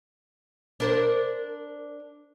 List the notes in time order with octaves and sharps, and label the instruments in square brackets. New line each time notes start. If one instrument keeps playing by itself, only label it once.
[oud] D4 A#4 C5